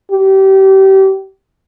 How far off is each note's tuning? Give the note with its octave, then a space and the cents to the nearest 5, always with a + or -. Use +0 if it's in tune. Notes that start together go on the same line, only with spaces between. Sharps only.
G4 -30